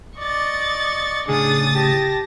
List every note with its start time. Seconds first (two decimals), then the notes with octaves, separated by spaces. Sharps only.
0.19 D5 D#5 C#6 A6
1.28 A2 C#3 D4 G#4 D#6 A6
1.74 G4 A5 A#6